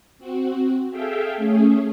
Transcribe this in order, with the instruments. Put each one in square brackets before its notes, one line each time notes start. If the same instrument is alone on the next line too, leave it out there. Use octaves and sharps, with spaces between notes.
[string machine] C4 F#4
G#4 A4 E5 F5 G5
A3 C#4 G#4